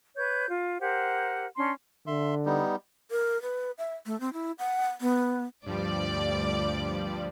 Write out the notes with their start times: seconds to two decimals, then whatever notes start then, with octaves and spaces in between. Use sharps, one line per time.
0.17 B4 C#5 G6
0.48 F4
0.81 G4 A#4 C5 F#5
1.56 C#4 D4 C6
2.07 D3 E5 C6
2.46 G3 B3 D#4
3.11 A#4
3.42 B4
3.78 E5
4.06 A3
4.20 C4
4.33 E4
4.59 F#5
5.01 B3
5.66 D2 G2 F3 G3 D5